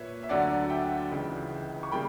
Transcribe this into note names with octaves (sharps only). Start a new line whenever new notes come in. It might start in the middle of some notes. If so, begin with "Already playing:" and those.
Already playing: A#2 A#3 B4 C#5 E5
E5
D2 D3 F#3 D5 F#5
E5 G5
C#2 C#3 E3
C#6
C#3 G3 A#3 G5 B5